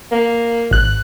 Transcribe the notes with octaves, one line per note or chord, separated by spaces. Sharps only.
A#3
G#1 F#6